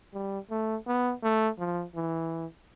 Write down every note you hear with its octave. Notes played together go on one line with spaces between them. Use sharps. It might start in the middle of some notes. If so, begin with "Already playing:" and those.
G3
A3
B3
A3
F3
E3